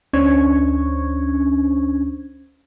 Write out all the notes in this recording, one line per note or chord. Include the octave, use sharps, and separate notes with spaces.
D2 C#4 D4 C5 C#6 G#6